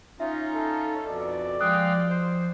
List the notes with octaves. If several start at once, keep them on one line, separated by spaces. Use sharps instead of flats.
C#4 D#4 F4 E5
A4
F2 B2 D5
F3 G#3 F5 G5 D#6 F#6
C5